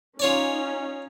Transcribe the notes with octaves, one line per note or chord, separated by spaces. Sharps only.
C#4 D#4 F4 C#5 D5